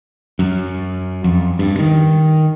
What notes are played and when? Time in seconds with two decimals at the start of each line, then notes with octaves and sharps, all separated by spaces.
0.39 F#2
1.24 F2
1.59 G2
1.79 D#3